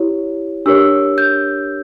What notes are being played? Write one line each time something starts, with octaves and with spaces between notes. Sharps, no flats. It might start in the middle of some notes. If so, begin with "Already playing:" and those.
Already playing: E4 G4 C#5
D4 G4 A#4 C#5 E6
G6